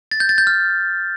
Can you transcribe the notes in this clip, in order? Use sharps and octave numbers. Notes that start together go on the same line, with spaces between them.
A6
G6
A6
G6
F6